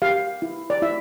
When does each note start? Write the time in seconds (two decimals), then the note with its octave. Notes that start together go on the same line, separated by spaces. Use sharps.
0.02 G4 F5
0.42 E4
0.70 D5
0.82 E4 E5